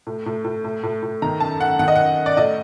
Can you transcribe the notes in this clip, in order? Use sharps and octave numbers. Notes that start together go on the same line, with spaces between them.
A2
A2
A2
A2
A2
A2
D#3 A#5
F#2 A5
F#2 F#5
D#3 F#5
D#5
F#2 F#5
F#2
D5
A2 D#5